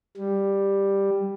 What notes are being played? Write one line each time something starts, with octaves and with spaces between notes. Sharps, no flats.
G3